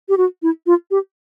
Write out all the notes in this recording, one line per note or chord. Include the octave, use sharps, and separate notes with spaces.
G4
F#4
E4
F4
G4